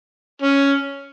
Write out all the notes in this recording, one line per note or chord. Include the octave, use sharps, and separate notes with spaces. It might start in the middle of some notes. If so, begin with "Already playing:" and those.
C#4